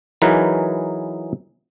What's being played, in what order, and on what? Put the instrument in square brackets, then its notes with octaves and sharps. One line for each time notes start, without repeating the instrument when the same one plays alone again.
[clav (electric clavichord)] E3 F#3 D#4 G#4 A#4 B4